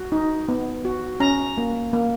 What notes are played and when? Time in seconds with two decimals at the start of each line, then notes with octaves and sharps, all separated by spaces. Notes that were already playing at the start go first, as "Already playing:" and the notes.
Already playing: F#4
0.12 D#4
0.48 B3
0.85 F#4
1.20 C#4 A#5
1.58 A#3
1.93 A#3